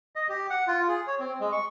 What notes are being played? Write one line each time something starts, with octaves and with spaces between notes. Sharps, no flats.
D#5
G4
F#5
F4
G#4
C#5
C4
G#3
C#6